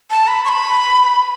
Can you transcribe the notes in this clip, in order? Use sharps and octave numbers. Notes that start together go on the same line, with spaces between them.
A5
B5
C#6
B5